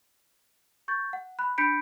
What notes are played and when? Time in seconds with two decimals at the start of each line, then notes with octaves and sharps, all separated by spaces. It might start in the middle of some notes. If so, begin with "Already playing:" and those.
0.88 C#6 G6 A6
1.13 F#5
1.39 B5 F#6
1.58 D4 B5 G6 B6 C#7 D7